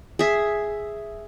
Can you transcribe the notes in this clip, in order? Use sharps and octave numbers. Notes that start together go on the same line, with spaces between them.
G#4 E5